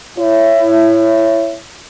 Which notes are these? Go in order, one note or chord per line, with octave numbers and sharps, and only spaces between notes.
E4 C#5